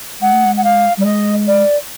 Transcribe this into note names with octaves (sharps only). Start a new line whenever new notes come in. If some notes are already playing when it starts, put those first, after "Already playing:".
G#3 F#5
A3
G#3
F#5
F5
G3
D5
G#3 D#5
D5